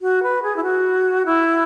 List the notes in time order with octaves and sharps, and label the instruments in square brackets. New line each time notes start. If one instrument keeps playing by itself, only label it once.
[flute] F#4
B4
G#4
E4
F#4
E4